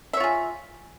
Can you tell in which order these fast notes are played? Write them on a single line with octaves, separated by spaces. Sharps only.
E5 C#5 F4 G#4